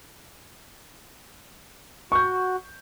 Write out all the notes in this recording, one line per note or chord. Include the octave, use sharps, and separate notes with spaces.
F#4 C#6 G6